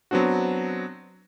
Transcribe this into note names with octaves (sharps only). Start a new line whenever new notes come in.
F#3 B3 C4 D4 F#4